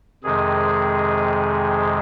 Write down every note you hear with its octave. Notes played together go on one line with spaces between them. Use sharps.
F2 C3 D#3 G#3 G#4